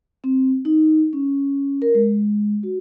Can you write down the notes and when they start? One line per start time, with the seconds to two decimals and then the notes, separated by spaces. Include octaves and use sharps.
0.24 C4
0.65 D#4
1.13 C#4
1.82 A#4
1.95 G#3
2.63 F#4